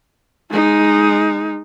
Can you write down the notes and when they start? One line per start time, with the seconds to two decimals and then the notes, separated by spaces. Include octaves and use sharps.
0.51 G#3 D#4